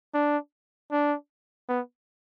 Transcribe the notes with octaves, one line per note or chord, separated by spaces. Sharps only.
D4
D4
B3